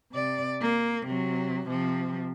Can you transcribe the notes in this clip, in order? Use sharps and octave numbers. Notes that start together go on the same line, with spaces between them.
C3 D5
A#3
C3 F#3
C3 F3